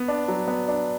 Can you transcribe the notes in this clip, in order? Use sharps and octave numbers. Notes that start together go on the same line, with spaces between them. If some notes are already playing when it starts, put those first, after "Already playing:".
Already playing: B3
D4
F#3
B3
D4